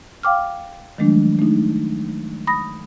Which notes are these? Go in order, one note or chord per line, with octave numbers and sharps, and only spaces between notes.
F5 G5 D6 F6
D#3 F3 F#3 G#3 A3 D4
A3 D4 D#4
B5 D#6 A#6